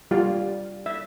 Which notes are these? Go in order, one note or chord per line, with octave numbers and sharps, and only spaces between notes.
G3 F4 F5
E5